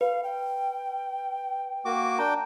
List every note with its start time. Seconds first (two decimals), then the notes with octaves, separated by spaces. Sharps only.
0.01 B4 F5
0.23 G5
1.85 A#3 F#4 D6
2.19 D4 G5 A#5